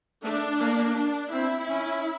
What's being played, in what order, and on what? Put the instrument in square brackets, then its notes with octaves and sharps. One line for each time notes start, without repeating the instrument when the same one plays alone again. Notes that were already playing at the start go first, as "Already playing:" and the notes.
[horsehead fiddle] A3 [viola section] D4
[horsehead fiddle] A#3
[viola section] D4
[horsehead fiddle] C4 [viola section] E4
[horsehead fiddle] C#4